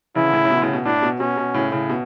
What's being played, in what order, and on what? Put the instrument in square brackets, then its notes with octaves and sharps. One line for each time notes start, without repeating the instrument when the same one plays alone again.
[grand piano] C#3 E3 [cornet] E4
[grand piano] D3
A2 C#3
A2
B2
D3
A2 C#3
B2
[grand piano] A2 [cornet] D4
[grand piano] B2
[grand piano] B2 [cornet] C#4
[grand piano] B2
A2 C#3
A2 C#3
B2